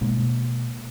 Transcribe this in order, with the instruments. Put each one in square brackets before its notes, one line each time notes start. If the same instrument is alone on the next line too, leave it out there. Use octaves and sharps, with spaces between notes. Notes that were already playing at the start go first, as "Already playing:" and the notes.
[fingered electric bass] B2 G#3 A#3